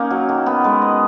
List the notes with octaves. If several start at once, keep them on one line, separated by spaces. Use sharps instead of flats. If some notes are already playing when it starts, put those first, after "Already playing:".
Already playing: A#3 C#4 D#4
F#3
D#3
B3
G#3
D#5